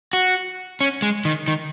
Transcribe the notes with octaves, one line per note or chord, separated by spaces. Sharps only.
F#4
C#4
G#3
D#3
D#3